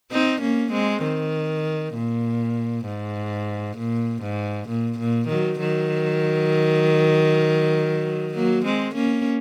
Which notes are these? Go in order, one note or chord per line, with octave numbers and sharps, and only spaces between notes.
C4 D#4
A#3 C#4
G#3 C4
D#3
A#2
G#2
A#2
G#2
A#2
A#2
D#3 F#3
D#3 F#3
F#3 A#3
G#3 C4
A#3 C#4